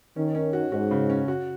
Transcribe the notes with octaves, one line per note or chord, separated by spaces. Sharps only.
D#3 C#4
C#4
F#4
G#2 F#4
C#3
C#4
F#4